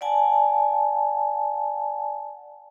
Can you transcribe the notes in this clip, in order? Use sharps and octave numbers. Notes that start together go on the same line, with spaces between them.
D5 F#5 G#5 A5